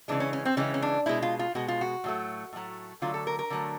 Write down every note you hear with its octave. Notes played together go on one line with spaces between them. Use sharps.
C#3 E3 G#3 D4
C#4
C#4
C4
C#3 E3 G#3 C#4
C#4
D4
B2 G#3 E4
F4
F4
B2 G#3 F#4
F4
F#4
A2 F#3 A3
A2 F#3 A3
D3 F#3 A3 F4
A4
A#4
A#4
D3 F#3 A3